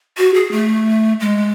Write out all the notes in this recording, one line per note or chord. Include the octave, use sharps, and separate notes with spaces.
F#4
G#4
A3
G#3